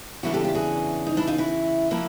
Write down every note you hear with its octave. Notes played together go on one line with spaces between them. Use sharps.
E2 C#3 E3 A3 D4 E4 F#4
G4 A4
F4 G4
F#4 G#4
D#4
D4 E4
D#4 F4
E4 F#4
F3 A#3 E4 F#4